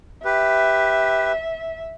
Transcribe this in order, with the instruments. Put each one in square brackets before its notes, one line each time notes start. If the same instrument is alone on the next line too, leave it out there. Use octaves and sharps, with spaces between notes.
[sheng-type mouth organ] G4 B4 [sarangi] E5